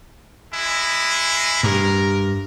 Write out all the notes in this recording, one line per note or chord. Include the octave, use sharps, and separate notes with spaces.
G#3 E4
G2 A#4